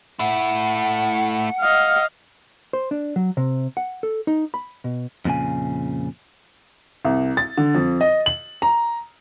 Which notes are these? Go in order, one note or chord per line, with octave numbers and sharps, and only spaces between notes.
A3 E4 F#5
D#5 F5
C5
D4
F#3
C3
F#5
A4
D#4
B5
B2
F2 A#2 C#3 G#5
C2
A6
D3
F2
D#5
F#7
A#5